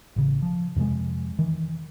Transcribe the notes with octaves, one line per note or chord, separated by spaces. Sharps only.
A1 C#3
F3
F2 C3 F3 G#3
D#3 E3